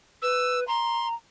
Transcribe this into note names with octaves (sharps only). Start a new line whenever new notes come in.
B4 E6
A#5 C6